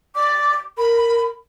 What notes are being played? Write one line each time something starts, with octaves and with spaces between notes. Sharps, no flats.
D5 D6
A#4 B5